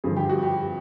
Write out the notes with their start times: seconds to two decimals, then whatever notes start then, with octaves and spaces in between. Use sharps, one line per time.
0.04 G2 D3 F3 G#4
0.16 G4
0.29 F#4
0.43 G4